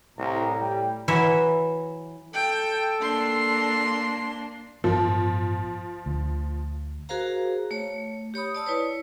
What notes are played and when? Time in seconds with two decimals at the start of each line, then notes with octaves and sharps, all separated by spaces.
0.18 C2 A2 A#5
0.60 G3 G5
1.08 E3 F#3 C#5 E5
2.34 A4 G5
3.01 A#3 D4 C6
4.84 A1 G2 F3 B3
6.06 D2
7.09 F#4 G#4 A#4 C5 F5 A#5
7.71 A3 C#5
8.34 G4 C#5 B5 D#6
8.55 D5 A5 D#6 E6
8.66 E4 B4 C#5